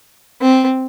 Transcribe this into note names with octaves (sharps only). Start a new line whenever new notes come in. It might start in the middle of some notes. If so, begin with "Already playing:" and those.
C4